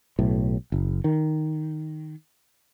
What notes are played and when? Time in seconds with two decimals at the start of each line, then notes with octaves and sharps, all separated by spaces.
0.19 B1 A2
0.72 F#1
1.04 D#3